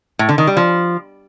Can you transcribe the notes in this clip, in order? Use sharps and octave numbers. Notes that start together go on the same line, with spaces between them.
A2
D3
D#3
G3
F3